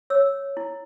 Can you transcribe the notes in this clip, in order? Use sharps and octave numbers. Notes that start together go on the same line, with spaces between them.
C#5 E6
E4